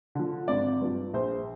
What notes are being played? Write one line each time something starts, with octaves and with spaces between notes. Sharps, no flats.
D3 F3
G#1 D5
G2 F3
A#1 C5